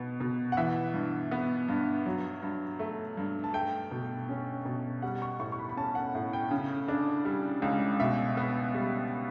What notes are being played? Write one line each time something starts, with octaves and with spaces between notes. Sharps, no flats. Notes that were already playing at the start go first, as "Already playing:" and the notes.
Already playing: B2 B3
B2
F#5
E3 E5
G2
B3
G2
F#3
G2
A3
G2
A5
A3 G5
B2
C#4
B2
G3 F#5
C#6
A2 C#6
C#6
B5
B5
C#4 A5
F#5
A2
G5
C#3
D4
G3
C#2
B2 E5
B3
G3